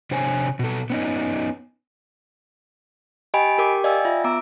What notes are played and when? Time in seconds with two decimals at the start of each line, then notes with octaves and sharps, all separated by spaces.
0.11 C3 D4 C5 C#5 G#5
0.59 B2 A4
0.90 B3 C#4 D#4
3.34 G4 D#5 G5 G#5 B5 D7
3.58 G4 A#4 G5 D6
3.84 D5 D#5 F5 G5 G#5 E6
4.05 F4 E5
4.24 B3 A#5 D6 E6 D7